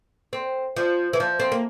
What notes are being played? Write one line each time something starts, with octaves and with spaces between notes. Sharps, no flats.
C4
F3
E3
F3
C4
A#3